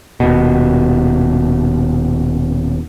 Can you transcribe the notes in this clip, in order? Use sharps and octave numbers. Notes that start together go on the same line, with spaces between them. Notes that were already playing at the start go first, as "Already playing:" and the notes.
D#1 B2